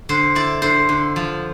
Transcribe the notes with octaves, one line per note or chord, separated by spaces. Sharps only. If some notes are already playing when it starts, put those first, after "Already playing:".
D3 C5
E4 D5
D3 C5
D3
F3